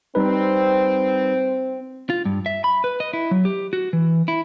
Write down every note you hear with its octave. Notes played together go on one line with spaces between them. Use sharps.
G3 C4 D#4 B4
F4
G2
E5
B5
B4
D#5
E4
F#3
G4
F#4
E3
E4